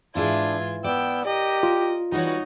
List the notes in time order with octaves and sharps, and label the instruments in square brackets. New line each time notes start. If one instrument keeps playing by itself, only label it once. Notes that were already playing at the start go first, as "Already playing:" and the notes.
[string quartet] G#2 F4 G#6 [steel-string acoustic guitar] E3 E4 G#4 [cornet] D4
[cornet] B3 [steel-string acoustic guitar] D5 [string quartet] G5 E6
[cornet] G4 [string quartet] A#4 D#5
[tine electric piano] F4
[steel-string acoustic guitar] E3 G3 [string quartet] D#4 F#4 C#5